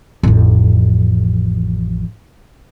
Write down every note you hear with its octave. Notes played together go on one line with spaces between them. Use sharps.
A1 F2